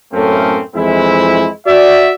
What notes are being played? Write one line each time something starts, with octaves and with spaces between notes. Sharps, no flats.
F#2 A2 A3 A#3 C4 C#4
F2 E3 G#3 C4 E4
F#4 D5 E5